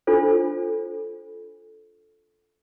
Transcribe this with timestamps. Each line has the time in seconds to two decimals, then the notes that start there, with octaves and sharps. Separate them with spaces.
0.07 D4 F4 A4 C5